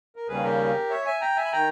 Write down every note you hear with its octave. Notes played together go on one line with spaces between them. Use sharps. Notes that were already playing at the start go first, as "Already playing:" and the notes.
A#4
D#2 C#3 G3 A#3 C#4 G#4 B4
G4 A#4
C#5 E5
E5 G#5
G5 A#5
E5 G#5
B5
D#3 G5 A#5